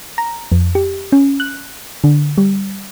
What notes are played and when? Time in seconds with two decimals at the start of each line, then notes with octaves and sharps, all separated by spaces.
0.18 A#5
0.52 F2
0.75 G4
1.12 C#4
1.40 F#6
2.04 D3
2.38 G3